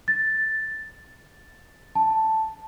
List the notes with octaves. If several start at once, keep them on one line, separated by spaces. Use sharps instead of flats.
A6
A5